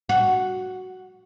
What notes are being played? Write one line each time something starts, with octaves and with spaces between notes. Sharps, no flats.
F#4